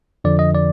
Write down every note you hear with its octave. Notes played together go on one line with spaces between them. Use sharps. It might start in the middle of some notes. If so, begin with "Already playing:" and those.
F2 D3 F3 D5
D#5
D5